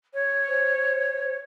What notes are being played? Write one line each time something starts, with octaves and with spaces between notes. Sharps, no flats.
C#5
C5